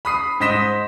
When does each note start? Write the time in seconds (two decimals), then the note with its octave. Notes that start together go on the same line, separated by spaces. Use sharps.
0.05 B5 D#6 C7
0.40 G#2 C5 D#5 B6 E7